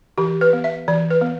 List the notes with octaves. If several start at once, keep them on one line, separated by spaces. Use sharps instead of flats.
E3 G4
B4
B3
E5
E3 D5
B4
B3